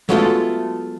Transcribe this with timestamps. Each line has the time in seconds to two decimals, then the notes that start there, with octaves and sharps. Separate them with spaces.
0.09 F#3 G#3 A3 B3 F4 A4